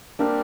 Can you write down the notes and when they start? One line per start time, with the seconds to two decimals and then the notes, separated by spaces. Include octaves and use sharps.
0.19 G3 A#3 C4 D4 G4 A#4